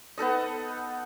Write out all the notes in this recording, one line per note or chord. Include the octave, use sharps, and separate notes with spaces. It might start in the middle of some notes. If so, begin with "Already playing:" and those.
B3 D#4 A4 D#5